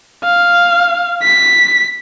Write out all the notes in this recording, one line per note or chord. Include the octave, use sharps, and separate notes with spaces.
F5
B6